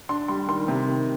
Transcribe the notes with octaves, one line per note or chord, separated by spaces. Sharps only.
D4 C6
G3 C6
D#3 C6
C3
D#3